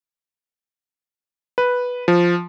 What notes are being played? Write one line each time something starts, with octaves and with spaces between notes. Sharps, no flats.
B4
F3